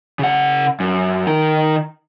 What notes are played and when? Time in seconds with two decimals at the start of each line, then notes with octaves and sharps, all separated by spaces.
0.19 C#3 F#5
0.80 F#2
1.27 D#3 A#4